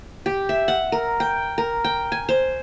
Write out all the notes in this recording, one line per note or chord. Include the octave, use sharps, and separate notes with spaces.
G4
E5
F#5
A#4
G5
A#4
G5
G#5
C5